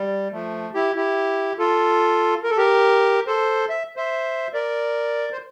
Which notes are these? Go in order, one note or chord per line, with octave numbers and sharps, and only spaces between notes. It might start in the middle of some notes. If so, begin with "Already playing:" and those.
Already playing: G3
F3 A3
E4 G4
E4 G4
F4 A4
A#4
A4
G4 A#4
A4 C5
E5
C5 E5
A#4 D5
C5